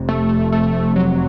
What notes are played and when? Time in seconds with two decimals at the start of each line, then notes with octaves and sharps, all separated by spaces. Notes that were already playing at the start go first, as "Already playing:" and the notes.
Already playing: F1 F2 C3
0.09 A3
0.52 A3
0.96 F#3